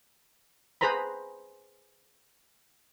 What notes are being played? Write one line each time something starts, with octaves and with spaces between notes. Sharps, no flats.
G#4 B4 C5 A#5 B5